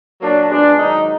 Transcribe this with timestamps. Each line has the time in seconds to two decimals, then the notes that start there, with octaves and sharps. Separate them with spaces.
0.21 A#2 F#3 A#3 D4
0.50 A#2 G#3 B3 D4
0.79 G#2 D#3 F#3 D#4